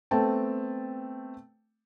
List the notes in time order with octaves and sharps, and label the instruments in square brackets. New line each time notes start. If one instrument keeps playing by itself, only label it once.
[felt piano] A3 B3 C4 G5 A5